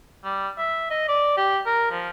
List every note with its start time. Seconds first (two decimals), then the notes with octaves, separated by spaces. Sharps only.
0.24 G3
0.59 E5
0.90 D#5
1.08 D5
1.38 G4
1.66 A#4
1.92 F3